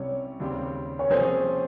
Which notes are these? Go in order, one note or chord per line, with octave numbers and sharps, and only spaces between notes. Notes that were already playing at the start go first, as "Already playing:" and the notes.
Already playing: C2 C3 G3 C#4 C#5
D#2 C#3 G3 C4 G4
C#5
C3 F3 A#3 C#4 G#4 C5